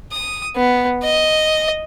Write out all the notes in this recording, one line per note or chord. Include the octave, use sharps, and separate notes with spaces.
D#6
B3
D#5